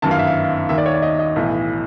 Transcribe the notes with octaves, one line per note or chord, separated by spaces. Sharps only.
G1 F#2 D#3 A5
F5
E5
F5
D#2 D#3 E5
D5
C#5
D5
D#5
D#5
B1 A2 E3